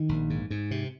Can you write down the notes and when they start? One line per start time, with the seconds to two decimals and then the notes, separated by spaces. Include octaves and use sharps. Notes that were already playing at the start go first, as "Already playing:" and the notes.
Already playing: D#3
0.09 A#1
0.30 G#2
0.50 G#2
0.71 C3